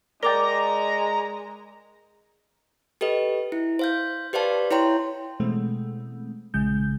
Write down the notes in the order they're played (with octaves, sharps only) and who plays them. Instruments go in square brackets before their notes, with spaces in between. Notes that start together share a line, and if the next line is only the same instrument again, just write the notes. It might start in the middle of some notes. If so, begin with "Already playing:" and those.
[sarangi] G#3 [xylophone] A#4 D6 A6 [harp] D5 G5 [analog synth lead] A#5
[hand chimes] G4 A4 B4 D#5
E4
C5 F5 G6
G4 B4 C5 D5 F5 A5
E4 C#5 G5 A#5 C6
[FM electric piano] B2 E3 G#3 A3 C4
A#1 C#3 G#3 G6